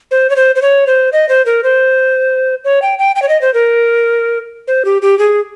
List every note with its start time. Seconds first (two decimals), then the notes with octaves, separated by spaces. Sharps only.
0.11 C5
0.30 C#5
0.36 C5
0.56 C5
0.62 C#5
0.87 C5
1.13 D#5
1.29 C5
1.46 A#4
1.64 C5
2.64 C#5
2.82 G5
2.99 G5
3.16 G5
3.22 C#5
3.29 D#5
3.41 C5
3.54 A#4
4.68 C5
4.85 G4
5.02 G4
5.19 G#4